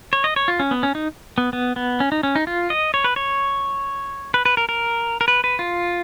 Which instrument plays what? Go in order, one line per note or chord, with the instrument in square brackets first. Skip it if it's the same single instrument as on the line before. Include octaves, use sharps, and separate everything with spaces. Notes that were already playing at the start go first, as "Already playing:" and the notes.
[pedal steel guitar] C#5
D#5
C#5
F4
C#4
B3
C#4
D#4
B3
B3
B3
C#4
D#4
C#4
D#4
F4
D#5
C#5
B4
C#5
B4
B4
A#4
A#4
A#4
B4
B4
F4